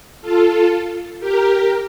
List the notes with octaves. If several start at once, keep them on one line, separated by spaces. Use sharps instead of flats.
F4 A4
G4 A#4